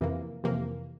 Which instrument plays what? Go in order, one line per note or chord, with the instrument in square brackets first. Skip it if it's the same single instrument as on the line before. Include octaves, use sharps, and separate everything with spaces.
[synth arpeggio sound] F2 C3 E3 A#3
F2 C3 E3 A#3